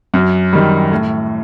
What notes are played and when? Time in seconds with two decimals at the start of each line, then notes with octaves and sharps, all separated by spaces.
0.14 F#2
0.53 D#3 G3
0.92 A2